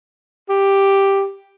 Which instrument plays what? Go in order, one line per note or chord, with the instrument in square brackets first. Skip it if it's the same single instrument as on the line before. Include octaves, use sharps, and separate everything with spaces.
[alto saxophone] G4